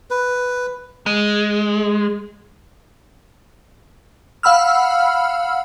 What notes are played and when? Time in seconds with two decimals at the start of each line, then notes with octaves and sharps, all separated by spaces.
0.11 B4
1.06 G#3
4.43 F5 F#5 B5 E6 F6